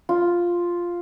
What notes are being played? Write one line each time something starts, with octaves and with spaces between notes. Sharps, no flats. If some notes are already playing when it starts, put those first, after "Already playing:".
F4